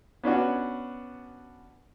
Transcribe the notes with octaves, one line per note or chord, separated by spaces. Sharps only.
B3 C#4 D4 F#4